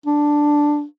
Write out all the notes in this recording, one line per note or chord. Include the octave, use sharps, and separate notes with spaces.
D4